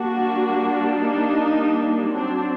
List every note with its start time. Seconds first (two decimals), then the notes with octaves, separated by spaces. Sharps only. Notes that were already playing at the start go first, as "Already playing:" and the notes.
Already playing: G3 A#3 D4 F#4
0.91 D#4
2.13 F#3 C4 D4